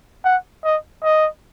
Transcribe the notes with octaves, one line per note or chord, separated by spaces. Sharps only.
F#5
D#5
D#5